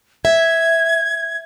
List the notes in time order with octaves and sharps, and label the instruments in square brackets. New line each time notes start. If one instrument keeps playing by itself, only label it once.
[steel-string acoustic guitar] E5 [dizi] G#6